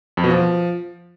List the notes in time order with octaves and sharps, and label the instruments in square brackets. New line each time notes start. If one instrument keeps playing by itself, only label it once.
[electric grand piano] F2
B2
F3